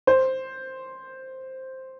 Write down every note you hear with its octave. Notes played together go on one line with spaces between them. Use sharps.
C5